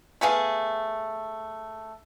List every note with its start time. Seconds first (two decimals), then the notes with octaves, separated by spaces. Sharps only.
0.21 A3 B3 G#4 F5